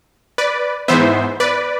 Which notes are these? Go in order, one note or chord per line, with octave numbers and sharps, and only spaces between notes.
B4 D5
G#2 E3 B3 C5 E5
B4 D5